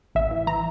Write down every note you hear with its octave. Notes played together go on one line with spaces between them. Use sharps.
A1 E5
E3
E3 A#5